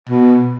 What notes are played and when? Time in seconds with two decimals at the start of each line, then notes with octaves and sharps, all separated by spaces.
0.09 B2